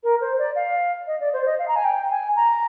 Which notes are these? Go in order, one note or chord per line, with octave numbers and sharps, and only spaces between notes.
A#4
C5
D5
F5
D#5
D5
C5
D#5
F5
A#5
G#5
G5
G#5
A#5